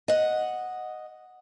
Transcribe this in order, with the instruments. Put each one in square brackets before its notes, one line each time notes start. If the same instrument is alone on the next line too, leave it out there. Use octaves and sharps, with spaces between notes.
[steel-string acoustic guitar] D#5 F#5